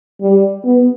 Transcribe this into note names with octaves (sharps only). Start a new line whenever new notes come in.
G3
B3